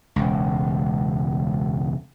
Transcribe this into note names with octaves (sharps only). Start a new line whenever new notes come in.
E1 C#2